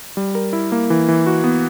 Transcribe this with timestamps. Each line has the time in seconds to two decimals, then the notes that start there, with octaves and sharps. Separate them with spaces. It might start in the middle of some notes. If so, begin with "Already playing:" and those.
0.17 G3
0.35 A#4
0.53 E4
0.72 A#3
0.90 E3
1.08 E3
1.26 F#4
1.44 B3